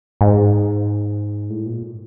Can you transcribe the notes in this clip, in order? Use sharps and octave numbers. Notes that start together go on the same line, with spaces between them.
G#2
A2
A#2